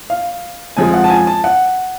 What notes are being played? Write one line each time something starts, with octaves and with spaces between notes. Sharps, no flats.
F5
F2 F3 G#3 G#5
F#5
A5
G#5
A5
F#5